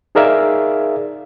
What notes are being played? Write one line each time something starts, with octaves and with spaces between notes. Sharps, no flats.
D#4 G#4 A#4 D5 E5 F5